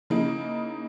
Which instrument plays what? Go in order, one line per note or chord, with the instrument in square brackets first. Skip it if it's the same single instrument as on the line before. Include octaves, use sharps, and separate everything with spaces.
[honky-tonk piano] C#3 A#3 D#4 E4